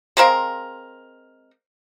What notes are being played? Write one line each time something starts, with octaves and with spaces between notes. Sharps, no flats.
G#3 C4 A#4 F5